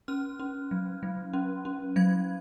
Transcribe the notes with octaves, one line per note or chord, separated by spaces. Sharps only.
C#4 F6
C#4
F#3
F#3
C#4
C#4
F#3 G#6